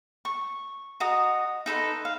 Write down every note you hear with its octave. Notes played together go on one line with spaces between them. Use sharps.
C#6
F#4 D#5 A#5 D#6
D#4 A4 B4 C6
F5